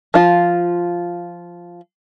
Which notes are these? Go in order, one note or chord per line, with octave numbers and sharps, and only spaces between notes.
F3 F4